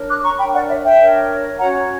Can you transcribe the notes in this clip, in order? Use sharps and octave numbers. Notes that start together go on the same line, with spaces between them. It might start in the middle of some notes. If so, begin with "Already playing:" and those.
Already playing: D4 A#4 C#5
D6 F#6
A#5 C#6
D4 A#4 C#5 G5 B5
D5 F#5
C#5 E5
E5 G5
D4 A#4 C#5
C#4 F#4 C#5 F#5 A#5